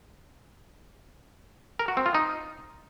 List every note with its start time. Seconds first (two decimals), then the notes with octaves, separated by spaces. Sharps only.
1.79 A#4
1.88 F#4
1.97 C4
2.06 F4
2.15 D#4